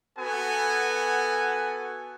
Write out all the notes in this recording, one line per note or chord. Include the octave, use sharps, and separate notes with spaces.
B3 F#4 A4 F#5 G#5